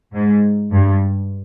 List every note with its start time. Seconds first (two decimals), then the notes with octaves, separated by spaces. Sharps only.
0.14 G#2
0.73 G2